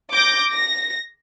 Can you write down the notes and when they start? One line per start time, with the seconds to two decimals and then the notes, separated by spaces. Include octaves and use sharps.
0.12 D6 G6 A#6
0.52 A#6